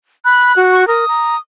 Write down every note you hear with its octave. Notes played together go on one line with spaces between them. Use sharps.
B5 F#6
F#4
C#6
A#4 D#6
A#5